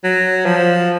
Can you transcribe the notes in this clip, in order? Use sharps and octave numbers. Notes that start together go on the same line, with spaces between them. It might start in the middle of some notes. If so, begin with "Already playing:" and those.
F#3
F3